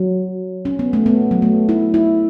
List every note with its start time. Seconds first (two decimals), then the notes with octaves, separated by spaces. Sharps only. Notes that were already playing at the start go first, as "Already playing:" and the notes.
Already playing: F#3
0.65 C#4
0.79 B3
0.93 A3
1.06 B3
1.31 F#3
1.42 A3
1.69 E4
1.94 E4